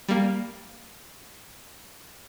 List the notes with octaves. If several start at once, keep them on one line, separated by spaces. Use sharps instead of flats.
G3 A#3